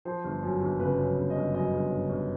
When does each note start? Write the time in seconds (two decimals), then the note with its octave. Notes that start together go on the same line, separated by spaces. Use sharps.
0.05 F3 C5
0.25 G1
0.43 F#2
0.62 G1
0.80 C#3 B4
0.99 F#2
1.17 G1
1.30 D#5
1.36 G1
1.54 F#2 D#5
1.73 G1
1.92 G1
2.10 G1